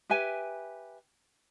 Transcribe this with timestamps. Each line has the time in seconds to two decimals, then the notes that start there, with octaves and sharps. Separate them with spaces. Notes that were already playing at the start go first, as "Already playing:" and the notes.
0.10 G4 B4 E5 G#5